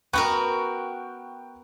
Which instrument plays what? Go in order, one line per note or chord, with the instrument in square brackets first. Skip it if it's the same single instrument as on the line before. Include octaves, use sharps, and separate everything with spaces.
[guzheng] B3 F#4 A#4 [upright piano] G5 C#6 F#6